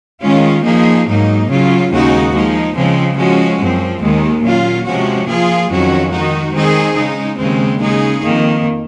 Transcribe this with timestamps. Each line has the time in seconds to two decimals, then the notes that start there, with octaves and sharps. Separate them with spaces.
0.22 D#3 G#3 C#4 F4
0.64 F3 A#3 D#4 G#4
1.06 G#2 F#3 A#3 D#4
1.48 C#3 F#3 C#4 F4
1.90 D#2 C#3 G#3 D#4 F#4
2.33 F3 G#3 D#4
2.75 C#3 F3 G#3 C4
3.17 F3 G#3 C#4 F#4
3.59 F#2 F3 C4
4.01 D#2 D#3 G#3
4.43 A#2 F#3 C#4 F4
4.85 C3 F3 G#3 C#4 F#4
5.28 F3 A#3 F4 G#4
5.69 F2 D#3 F#3 C#4 F#4
6.11 D#3 G#3 D#4 F#4
6.53 D#3 G#3 C4 D#4 G#4
6.95 C#3 G#3 D#4
7.38 D#2 C#3 G#3 C4
7.80 C#3 G#3 D#4 G#4
8.22 F2 D#3 A#3